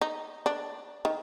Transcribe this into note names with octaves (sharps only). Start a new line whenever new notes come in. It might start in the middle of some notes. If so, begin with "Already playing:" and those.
D#4
D4
D#3